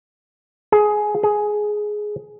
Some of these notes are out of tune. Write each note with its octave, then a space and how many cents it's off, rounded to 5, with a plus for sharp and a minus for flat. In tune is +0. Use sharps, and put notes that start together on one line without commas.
G#4 +15
G#4 +10